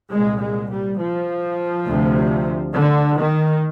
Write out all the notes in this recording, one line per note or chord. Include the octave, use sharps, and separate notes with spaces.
C2 A#2 G#3
G#3
G3
F3
D2 C3
D3
D#3